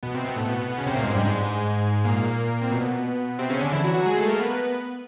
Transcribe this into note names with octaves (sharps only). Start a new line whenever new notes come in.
B2 B3
C3 C4
B2 B3
A2 A3
B2 B3
B2 B3
B2 B3
C#3 C#4
C3 C4
A#2 A#3
G#2 G#3
G2 G3
G#2 G#3
A#2 A#3
C4
B2 B3
C3 C4
C#3 C#4
D3 D4
E3 E4
F#3 F#4
F#3 F#4
G#3 G#4
A3 A4
A#3 A#4
B3 B4